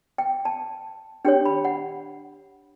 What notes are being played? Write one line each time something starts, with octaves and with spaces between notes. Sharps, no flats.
G5
A5
D4 G4 C#5 G5
B5
F#5